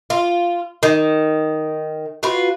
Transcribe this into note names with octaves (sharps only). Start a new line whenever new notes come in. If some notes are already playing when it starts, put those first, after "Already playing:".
F4
D#3
F4 F#4 B4